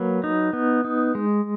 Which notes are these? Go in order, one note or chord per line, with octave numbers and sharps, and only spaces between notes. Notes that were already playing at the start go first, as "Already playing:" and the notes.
Already playing: F#3 A#3 B4
D#4
B3
D#4
G#3